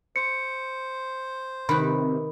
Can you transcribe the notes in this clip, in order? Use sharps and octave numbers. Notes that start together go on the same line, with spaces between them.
C5 C#7
C3 D#3 B4 B5